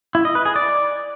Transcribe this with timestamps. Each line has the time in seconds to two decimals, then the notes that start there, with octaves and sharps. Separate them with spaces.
0.15 E4
0.25 D#5
0.35 B4
0.45 G#4
0.56 D5